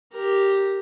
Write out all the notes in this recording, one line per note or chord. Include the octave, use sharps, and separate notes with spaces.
G4 A#4